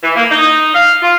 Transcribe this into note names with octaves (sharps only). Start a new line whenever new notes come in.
E3
A#3
D#4
F5
F4